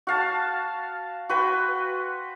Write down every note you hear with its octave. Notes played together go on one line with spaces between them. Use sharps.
F#4 F5 A5
F#4 B4 C5 G5